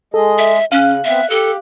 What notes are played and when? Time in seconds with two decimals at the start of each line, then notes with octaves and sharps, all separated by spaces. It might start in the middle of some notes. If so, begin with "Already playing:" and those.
0.14 G#3 G#4 A4 D#5
0.38 E5
0.72 C#3 C#4 F5 F#6
1.04 B3 C4 E5
1.30 G4 A4